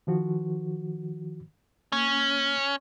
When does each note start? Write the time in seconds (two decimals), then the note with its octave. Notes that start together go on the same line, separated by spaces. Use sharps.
0.07 D#3 F3 F#4
1.92 A#3 C#4